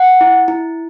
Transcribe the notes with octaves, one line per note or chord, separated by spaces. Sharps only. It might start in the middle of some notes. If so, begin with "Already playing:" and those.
Already playing: F#5
E4
E4